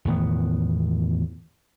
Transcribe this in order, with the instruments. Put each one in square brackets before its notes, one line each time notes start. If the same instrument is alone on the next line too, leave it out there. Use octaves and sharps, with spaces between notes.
[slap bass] E2 A2 D#3 B3